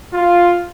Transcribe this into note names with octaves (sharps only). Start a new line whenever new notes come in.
F4